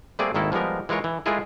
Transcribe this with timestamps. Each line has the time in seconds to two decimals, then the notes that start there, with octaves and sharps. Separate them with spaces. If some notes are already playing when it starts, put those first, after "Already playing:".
0.19 G3 A3 A#3 C4 G#4 D5
0.34 G#1 D#3 A#3 E4 A4
0.52 F3 G3 G#3 B3 A#4
0.89 E3 G#3 F4 A#4 C#5
1.04 E3
1.26 G#3 A3 E4 F4 G#4 A#4